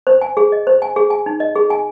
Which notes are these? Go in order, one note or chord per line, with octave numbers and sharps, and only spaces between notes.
C5
G#5
G#4
D#5
C5
G#5
G#4
G#5
D#4
D#5
G#4
G#5